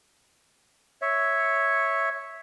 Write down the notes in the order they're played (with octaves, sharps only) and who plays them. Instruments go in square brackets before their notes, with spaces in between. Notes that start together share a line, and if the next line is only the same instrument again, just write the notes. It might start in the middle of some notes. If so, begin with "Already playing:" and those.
[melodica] C#5 E5